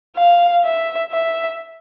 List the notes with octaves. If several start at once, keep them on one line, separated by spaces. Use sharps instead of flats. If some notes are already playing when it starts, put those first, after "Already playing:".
F5
E5
E5